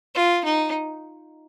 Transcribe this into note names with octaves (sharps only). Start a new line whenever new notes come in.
F4
D#4